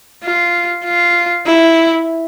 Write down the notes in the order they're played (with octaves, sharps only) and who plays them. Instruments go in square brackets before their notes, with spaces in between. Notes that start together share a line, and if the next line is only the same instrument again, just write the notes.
[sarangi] F4
F4
E4